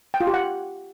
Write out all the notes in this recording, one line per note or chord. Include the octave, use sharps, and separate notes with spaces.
G5
F4
G4
F#5